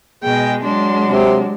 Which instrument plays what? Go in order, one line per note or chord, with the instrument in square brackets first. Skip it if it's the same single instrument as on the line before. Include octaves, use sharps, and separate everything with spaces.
[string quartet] B2 G#3 [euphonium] G#4 [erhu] G5
[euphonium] F#3 [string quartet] G#3 D4 [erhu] C6
[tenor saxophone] C3